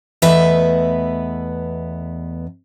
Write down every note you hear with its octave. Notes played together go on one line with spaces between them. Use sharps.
E2 A3 B3 B4 D#5 E5